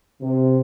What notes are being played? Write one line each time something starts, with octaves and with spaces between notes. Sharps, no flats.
C3